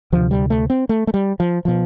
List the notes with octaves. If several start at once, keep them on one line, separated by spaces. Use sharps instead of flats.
D2 C3 F3
G3
A3
C4
A3
A3
G3
F3
B2 F3